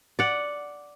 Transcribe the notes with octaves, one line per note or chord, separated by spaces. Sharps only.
D5 F#5